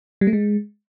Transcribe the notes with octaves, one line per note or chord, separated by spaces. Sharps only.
G3
A3
G#3